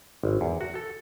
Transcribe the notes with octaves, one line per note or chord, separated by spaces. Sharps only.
G#1
E2
F#4
A4